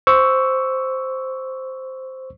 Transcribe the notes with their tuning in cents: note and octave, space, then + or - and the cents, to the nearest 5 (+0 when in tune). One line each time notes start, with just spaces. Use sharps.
C5 +0 C#6 +10 E6 +0